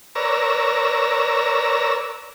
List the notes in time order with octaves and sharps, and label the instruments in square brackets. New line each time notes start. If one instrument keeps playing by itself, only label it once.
[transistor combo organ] A#4 B4 C#5 D5 A#5 E6